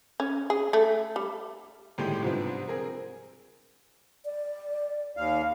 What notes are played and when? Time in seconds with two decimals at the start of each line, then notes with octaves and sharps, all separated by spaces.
0.20 C#4
0.50 G#4
0.73 A3
1.16 G3
1.98 G#1 A2 G#3 A3 G4 D#7
2.23 G#2 C3 F3 G3 B3 D4
2.68 C4 G#4 A#4
4.25 D5
5.17 D#2 F5